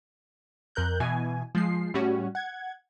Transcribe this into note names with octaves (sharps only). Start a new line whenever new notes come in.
F2 A#4 F#6 G6
B2 E3 G#5
F3 G#3 C7
A2 G3 C#4 F#4
F#5 G#6